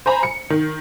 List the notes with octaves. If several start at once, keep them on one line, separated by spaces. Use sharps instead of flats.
C5 G#5 A#5 B5
C#7
D#3